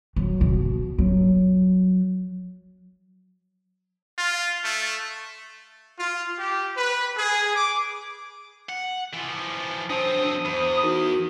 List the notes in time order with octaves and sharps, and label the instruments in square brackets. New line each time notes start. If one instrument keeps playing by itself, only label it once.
[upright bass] F#3
B2
F#3
[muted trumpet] F4
A3
[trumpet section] F4
G4
B4
G#4
D6
[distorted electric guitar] F#5
E3 F3
[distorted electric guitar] F#2 C4 [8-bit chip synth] D4 C5 A5 [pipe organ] D#6
[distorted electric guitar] E2 [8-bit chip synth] C5 B5
[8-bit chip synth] D#4 F#4 A#4